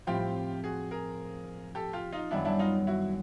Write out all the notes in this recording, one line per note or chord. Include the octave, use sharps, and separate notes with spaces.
A2 F3 A3 C4 F4 G4
F#4 G#4
G#4 A#4
G4 A4
F4 G4
D#4 F4
F#2 D#3 G3 B3 D4 E4
D4 E4
D#4 F4
E4 F#4